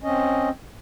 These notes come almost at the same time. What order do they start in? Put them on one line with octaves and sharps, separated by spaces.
C#4 D#5 C4